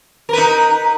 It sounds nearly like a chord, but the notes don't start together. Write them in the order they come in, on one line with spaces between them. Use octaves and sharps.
A#4 B4 D#4